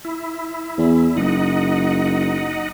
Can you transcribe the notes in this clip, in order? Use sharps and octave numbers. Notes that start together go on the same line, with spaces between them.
E4
E2
F#1 D#4 D#5 F#5